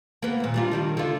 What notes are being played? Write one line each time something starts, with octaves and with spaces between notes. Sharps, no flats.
A#3 B3
D#2 A#2
G3 D4 F4
D#3 G3 D4
D3 F4